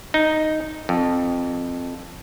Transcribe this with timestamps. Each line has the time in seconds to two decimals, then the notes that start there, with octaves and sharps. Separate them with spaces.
0.14 D#4
0.89 F2